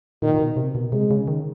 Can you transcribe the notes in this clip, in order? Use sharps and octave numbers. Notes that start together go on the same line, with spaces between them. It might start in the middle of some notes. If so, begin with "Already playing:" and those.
A#2 D#3
A#2
B2
C3
B2
C3 G#3
C#3
D#3